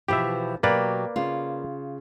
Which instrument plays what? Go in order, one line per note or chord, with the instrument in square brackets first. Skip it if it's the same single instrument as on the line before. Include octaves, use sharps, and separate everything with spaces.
[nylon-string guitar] B2 E3 F3 [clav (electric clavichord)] G4 E5
[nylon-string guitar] B2 F#3 G4 [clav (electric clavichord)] A#3 B4 D5
[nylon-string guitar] C#3 F4